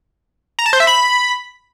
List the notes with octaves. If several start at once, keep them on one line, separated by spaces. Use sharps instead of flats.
A#5
A5
C5
E5
B5